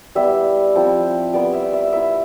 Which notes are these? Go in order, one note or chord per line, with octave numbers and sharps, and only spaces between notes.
G3 B3 E4 E5
F3 C4 E4
G3 B3 E4 D5
E5
E5
B3 E4 E5